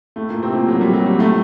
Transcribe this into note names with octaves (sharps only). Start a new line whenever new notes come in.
A2 A3
A#2 A#3
C3 C4
A#2 A#3
F#3
G3
F#3
G3
A2 A3